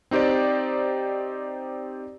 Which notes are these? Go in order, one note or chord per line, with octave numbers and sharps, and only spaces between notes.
C4 D#4 G4 C5 D5